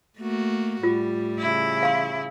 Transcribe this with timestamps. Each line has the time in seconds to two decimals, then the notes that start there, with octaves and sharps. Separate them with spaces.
0.18 A3 A#3 F#4
0.83 A2 G3 F4
1.39 C#3 E4
1.83 F5 C6